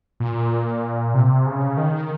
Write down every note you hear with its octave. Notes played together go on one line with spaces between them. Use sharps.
A#2
C3
C#3
D#3